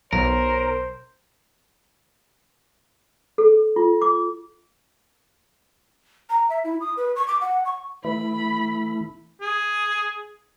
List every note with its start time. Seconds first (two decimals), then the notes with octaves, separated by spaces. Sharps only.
0.13 B1 A#4 C5 C#5
3.38 A4
3.76 F4
4.02 D6
6.30 A#5
6.50 E5
6.64 E4
6.81 D#6
6.97 B4
7.16 C#6
7.28 D6
7.41 F#5
7.65 C#6
8.05 E3 A3 E4 B5
9.41 G#4